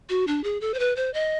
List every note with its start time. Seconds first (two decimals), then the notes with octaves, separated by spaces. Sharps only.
0.09 F#4
0.27 D4
0.44 G#4
0.61 A4
0.74 C5
0.79 B4
0.96 C5
1.14 D#5